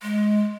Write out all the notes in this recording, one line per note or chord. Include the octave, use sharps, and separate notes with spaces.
G#3